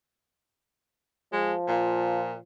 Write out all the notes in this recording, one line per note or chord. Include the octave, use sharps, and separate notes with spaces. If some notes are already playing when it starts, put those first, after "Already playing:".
F3 G#3
A#2